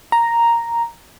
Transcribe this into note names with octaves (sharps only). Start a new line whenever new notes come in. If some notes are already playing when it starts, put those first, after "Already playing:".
A#5